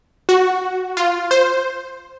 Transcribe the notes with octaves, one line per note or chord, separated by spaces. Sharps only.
F#4
F4
C5